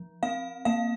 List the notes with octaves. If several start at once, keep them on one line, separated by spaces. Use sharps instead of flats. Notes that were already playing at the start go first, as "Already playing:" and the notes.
Already playing: F3
C4 F5
A#3 F5